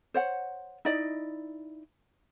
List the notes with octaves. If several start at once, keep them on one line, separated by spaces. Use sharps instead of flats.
C5 C#5 F#5
D#4 E4 D5 D#5